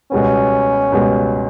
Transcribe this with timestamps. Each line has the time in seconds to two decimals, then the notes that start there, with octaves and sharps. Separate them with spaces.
0.12 C#2 B2 G3 B3 C#4
0.92 C#2 B2 G3 B3